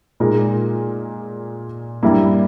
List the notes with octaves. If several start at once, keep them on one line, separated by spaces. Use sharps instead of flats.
A#2 G#3 D#4 A#4
G2 G3 A#3 E4